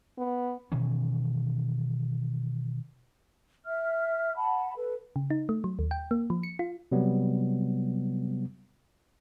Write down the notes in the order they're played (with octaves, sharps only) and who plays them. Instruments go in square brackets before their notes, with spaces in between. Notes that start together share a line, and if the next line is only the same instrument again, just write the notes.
[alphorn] B3
[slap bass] B2 D#3 E3 C#4
[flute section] E5 F6
F#5 A5 B5
A4 B4
[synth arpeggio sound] C#3
D#4
A3
F#3
D#2
G5
A#3
F3
C#7
F4
[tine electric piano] C3 F#3 G3 B3